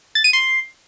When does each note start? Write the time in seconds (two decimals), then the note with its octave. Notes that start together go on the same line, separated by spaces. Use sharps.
0.15 A6
0.24 D#7
0.33 C6